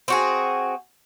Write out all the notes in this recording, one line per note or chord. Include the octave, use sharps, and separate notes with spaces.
C4 F#4 G#4